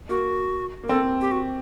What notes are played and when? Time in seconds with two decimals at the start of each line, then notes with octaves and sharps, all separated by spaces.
0.09 A#3 F#4
0.83 A#3
0.89 C4 A4
1.21 G4
1.31 F#4